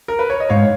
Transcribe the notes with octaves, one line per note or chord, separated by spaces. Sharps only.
A#4
B4
C#5
D#5
G#2 C#5 F5